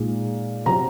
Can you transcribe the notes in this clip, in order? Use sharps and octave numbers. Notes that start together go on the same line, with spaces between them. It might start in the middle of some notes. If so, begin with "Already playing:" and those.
Already playing: A#2 G#3 D#4
C3 F#3 C4 A#5